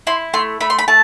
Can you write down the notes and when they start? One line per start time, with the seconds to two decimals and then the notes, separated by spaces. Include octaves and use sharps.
0.07 E4 C6
0.34 A3 C6
0.61 A3 B5
0.70 C6
0.79 B5
0.88 A3 A5